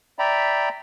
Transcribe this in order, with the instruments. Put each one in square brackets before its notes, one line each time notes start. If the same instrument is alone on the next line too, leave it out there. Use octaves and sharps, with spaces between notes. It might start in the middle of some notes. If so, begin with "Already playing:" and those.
[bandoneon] D5 E5 G5 A#5 B5